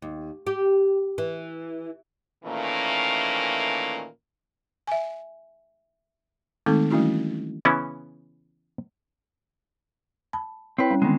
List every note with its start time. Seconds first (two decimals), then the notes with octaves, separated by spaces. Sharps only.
0.02 D#2
0.47 G4
1.18 E3
2.45 A#2 D#3 E3 A3 A#3 C#4
4.87 E5 G#5
6.66 D#3 G#3 A3 C4 D#4 A4
6.90 E3 G3 A3 C#4 E4 F#4
7.65 C#3 E3 B3 C#4 E4
10.33 A5 B5
10.78 C4 E4 B4 C#5 G5
10.91 G3 C#4
11.02 D3 D#3 G#3 B3 C4